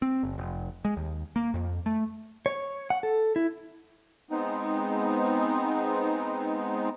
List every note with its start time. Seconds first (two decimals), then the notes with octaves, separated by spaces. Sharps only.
0.02 C4
0.23 F#1
0.38 F1
0.85 G#3
0.97 D#2
1.36 A#3
1.54 F2
1.86 A3
2.46 C#5
2.90 F#5
3.03 A4
3.36 E4
4.31 G#3 B3 C4 D#4